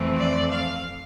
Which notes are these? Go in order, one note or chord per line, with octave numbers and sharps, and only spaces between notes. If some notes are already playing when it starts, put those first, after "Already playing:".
Already playing: F2 E3 A3 C4
D5
F5